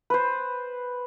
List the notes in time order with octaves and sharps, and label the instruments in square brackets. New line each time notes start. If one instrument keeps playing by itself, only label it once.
[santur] B4 C5